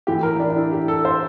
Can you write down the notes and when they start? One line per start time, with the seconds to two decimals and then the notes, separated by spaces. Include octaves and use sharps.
0.07 A2 E3 G4
0.23 A#4
0.40 D4
0.51 D4
0.56 E4
0.72 G4
0.88 A4
1.05 C5